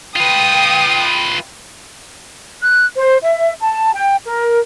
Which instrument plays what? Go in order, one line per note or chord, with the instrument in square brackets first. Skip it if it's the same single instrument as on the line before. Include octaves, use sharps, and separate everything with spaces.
[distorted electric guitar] F4 B4 [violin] G5 D#6
[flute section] F#6
C5
E5
A5
G5
A#4